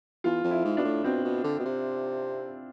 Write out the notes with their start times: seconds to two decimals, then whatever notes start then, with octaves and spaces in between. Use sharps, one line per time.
0.24 E2 F4
0.44 F2
0.51 E4
0.65 G#2
0.77 B2 D4
0.85 A2
1.04 B2 C4
1.24 B2
1.44 D3
1.59 B2
1.65 C3